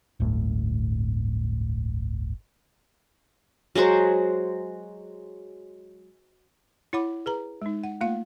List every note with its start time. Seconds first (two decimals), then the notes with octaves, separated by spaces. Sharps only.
0.20 D1 G1 A2
3.75 F#3 G#3 F#4 C5
6.93 E4 C#5 F#5 B5 D6
7.26 G#4 B4 A#5
7.62 G#3 D#4
7.84 F#5
8.01 A3 A#3 F4 F5 F#5